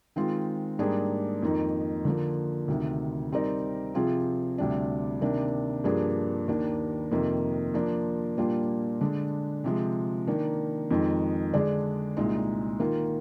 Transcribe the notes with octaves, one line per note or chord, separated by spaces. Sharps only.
D#3 G#3 C4 F4
G#2 G3 A#3 D4 G#4
F2 D#3 A#3 D#4
D3 F3 A#3
D2 C3 D#3
G3 C4 D#4 A#4 D5
C3 F3 C4 F4 G#4
D2 C3 G3 D4
C3 D#3 A#3 D4
G2 F3 A#3 D4 G#4
D#2 D#3 A#3 D4
F2 C3 D#3 A#3
F3 A#3 D4
A#2 G3 A#3 D4 F4
D3 G#3 D4
C3 F3 G#3
D#3 A#3 D4
F2 D#3 G#3 D#4
D3 G#3 D4 G#4 D5
C2 A#2 G#3 D#4
D#3 A#3 F4